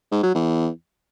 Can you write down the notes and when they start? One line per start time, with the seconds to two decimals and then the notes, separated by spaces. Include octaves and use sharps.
0.11 G#2
0.23 F#3
0.35 E2